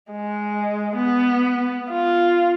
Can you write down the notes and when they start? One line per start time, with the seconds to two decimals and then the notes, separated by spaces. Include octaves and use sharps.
0.12 G#3
0.96 B3
1.90 F4